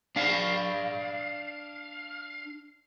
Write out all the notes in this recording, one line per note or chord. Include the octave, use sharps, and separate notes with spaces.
D4 F5